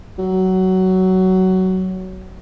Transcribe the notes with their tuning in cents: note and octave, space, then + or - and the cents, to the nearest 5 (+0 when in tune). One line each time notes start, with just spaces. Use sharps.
F#3 +15